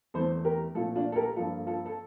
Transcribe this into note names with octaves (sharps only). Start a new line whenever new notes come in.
E2 E3 A3 A4 C5
G4 A#4
C2 A#2 F3 A3 F4 A4
D4 F4
A4
G4 A#4
G2 F3 A#3 F4 A4
F4 A4
A4